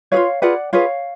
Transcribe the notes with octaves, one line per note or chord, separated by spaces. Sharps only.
F4 G#4 B4 C#5 F5
F4 G#4 B4 D5 F#5
F4 G#4 B4 C#5 F5